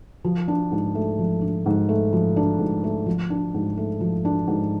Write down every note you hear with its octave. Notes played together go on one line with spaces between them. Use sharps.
F3
D4
G#2
A3
F3
D4
G#2
A3
F3
D4
G#2
A3
F3
D4
G#2
A3
F3
D4
G#2